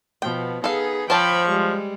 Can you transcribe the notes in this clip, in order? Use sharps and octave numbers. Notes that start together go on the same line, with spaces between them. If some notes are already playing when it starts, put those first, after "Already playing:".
B2 F3 B3 G5
B3 D#4 G#4 A4 F5
F3 C5 C#5 G5 A5 B5 C#6
G3 G#3